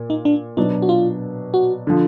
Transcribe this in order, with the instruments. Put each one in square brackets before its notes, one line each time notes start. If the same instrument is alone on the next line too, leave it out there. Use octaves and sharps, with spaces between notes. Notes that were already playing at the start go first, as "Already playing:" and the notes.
Already playing: [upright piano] A#2
[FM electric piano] D#4
D4
[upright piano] B2 F#3 D4 [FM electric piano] D#4
[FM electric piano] F#4
F4
F#4
[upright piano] D3 F3